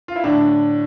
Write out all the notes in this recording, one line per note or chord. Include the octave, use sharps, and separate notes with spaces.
F4
E4
A2 D3 D4